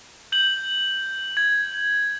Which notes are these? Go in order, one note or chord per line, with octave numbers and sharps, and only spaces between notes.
G6 F#7
G#6